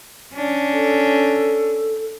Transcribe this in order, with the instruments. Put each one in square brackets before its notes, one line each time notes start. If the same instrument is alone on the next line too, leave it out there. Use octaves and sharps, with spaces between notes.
[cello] C#4 D4
[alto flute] A4